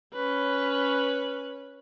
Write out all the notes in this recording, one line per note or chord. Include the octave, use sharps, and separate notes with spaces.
C#4 B4